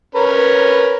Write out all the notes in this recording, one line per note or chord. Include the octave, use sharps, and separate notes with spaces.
C#4 A#4 B4